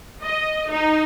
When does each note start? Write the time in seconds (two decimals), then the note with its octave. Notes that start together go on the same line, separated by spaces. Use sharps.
0.22 D#5
0.69 D#4